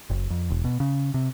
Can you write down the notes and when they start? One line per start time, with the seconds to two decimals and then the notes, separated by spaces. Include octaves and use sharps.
0.10 F#1
0.30 F2
0.50 E1
0.64 B2
0.80 C#3
1.14 C3